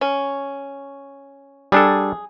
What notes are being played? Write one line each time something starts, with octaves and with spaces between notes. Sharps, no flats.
C#4
G3 D4 G#4 A4